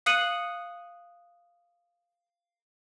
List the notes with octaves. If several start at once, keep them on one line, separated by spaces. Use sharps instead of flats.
F5 D#6 F#6 C#7 D#7 F#7